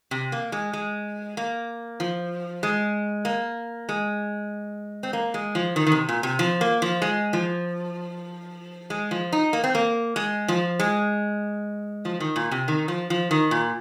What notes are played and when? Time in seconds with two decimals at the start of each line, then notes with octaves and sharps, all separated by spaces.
0.11 C3
0.32 A#3
0.52 G#3
0.73 G#3
1.37 A#3
2.00 F3
2.63 G#3
3.25 A#3
3.89 G#3
5.03 C4
5.13 A#3
5.34 G#3
5.55 F3
5.76 D#3
5.87 D#3
5.92 C3
6.09 A#2
6.23 C3
6.39 F3
6.61 A#3
6.82 F3
7.02 G#3
7.33 F3
8.90 G#3
9.11 F3
9.32 D#4
9.53 A#3
9.64 C4
9.75 A#3
10.16 G#3
10.48 F3
10.80 G#3
12.05 F3
12.20 D#3
12.36 A#2
12.51 C3
12.68 D#3
12.88 F3
13.10 F3
13.31 D#3
13.51 A#2